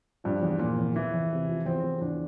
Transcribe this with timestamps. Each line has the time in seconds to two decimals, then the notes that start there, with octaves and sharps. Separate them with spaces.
0.24 G2 F3
0.42 E2
0.59 A#2 F3
0.78 E2
0.96 E2 E3
1.14 E2
1.31 C3
1.48 F3
1.66 E2 C4
1.83 E2
2.01 E2 D4